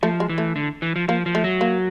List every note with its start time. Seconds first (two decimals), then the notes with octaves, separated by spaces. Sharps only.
0.03 F3 A3
0.20 G#3
0.29 E3
0.38 A3
0.56 D3
0.82 E3
0.96 F3
1.08 F3 A#3
1.26 F3
1.35 A3
1.44 F#3
1.61 A#3